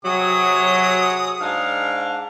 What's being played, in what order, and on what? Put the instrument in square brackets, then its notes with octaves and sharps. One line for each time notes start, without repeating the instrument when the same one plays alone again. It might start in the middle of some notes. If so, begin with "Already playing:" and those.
[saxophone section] C3 F#3 [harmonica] G#4 D#6
[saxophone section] G#2 D4 F5